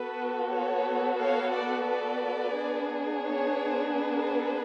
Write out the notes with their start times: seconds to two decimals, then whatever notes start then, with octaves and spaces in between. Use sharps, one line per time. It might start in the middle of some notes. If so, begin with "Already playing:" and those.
Already playing: B3 F#4 A4 B4
0.51 C#5
1.19 C#5 F5
1.53 D5 F#5
1.87 B4 D5
2.55 B3 D4 G#4
3.23 C#5
3.91 B4